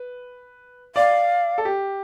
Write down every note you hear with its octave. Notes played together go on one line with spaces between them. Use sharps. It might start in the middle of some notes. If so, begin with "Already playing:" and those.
Already playing: B4
D5 F5
A4
G4